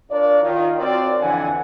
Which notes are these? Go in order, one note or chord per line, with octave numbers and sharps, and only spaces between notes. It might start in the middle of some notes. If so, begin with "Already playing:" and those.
D4 F4 A#4 C#5 D5
D#3 F4
C4 F4 F#4 A#4 C#5 D5
F2 D3 E3 F#5 G#5